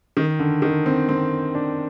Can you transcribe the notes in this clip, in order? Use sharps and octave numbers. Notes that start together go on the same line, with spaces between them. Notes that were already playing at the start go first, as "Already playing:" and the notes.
D#3
D3
D#3
C4
C4
D4